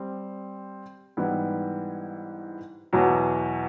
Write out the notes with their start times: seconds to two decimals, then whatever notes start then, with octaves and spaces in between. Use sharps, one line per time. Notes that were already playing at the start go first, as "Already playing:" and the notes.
Already playing: G3 C4
1.17 G#2 E3 G3 B3 E4
2.93 E2 B2 F#3